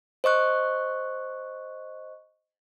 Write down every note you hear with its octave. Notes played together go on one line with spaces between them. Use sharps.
C5 D#5 C#6 F#6